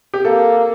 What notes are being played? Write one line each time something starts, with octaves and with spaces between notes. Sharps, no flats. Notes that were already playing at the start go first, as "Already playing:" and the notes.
G4
A#3 A4